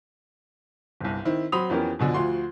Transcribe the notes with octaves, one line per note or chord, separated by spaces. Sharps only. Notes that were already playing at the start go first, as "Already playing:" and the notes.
G1 C2
D#3 C4 E4
F#3 C4 B5 C6 D#6 F7
F2 E3 B3 C#4 G4 A#4
F#2 B2 D3 F3
D2 F3 F4 F#4 C6